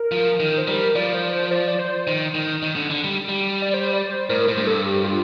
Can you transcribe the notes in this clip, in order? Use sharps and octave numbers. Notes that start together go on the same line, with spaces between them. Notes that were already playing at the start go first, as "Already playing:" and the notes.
Already playing: A#4
F3
D#3 A#4
C5
G3 A#4
F3 D5
C5
C5
D5
D5
C5
D#3
D#3
D#3
D3
D3
G3
G3
D5
C5
D5
C5
A2 A#4
A2 C5
G2
A4
G4
F4